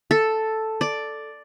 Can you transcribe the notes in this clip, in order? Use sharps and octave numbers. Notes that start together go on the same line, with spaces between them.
A4
D5